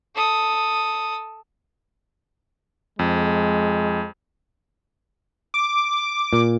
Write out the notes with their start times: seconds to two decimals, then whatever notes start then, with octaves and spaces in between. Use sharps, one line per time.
0.15 A4 D#6
2.99 F2 G#3
5.54 D6
6.33 A#2